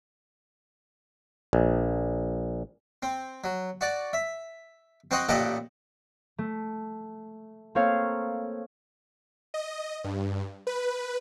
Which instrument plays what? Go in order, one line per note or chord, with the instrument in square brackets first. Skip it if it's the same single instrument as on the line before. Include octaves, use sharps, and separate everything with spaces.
[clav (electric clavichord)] A#1
[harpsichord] C4
F#3
F#4 D5
E5
C4 F#4 C5 D#5 F#5
A1 A#2 G4 A4 D#5 F#5
[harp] A3
A#3 C4 A4 C#5 F5
[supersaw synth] D#5
G2
B4